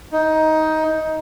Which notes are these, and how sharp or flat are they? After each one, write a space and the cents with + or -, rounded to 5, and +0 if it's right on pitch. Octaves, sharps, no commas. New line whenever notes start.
D#4 +15